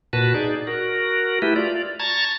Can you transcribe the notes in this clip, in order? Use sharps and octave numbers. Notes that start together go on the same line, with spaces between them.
A#2 F#4 B4 A5
D#4 G#4 D5
F#4 A#4
A3 E4 G4 B4
F4 D5
A5 A#5 C#6 G#6 A6